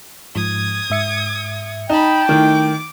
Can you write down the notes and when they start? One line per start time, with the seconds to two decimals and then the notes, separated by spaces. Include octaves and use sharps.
0.36 G#2 F3 D#6 G#6
0.90 G#2 E5 C#7
1.90 D#4 G5 A5 B5
2.29 D#3 A3 D#4 E4 D6